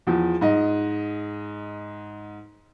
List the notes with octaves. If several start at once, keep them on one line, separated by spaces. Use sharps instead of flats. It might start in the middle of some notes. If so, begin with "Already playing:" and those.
E2 F3
G#2 D#5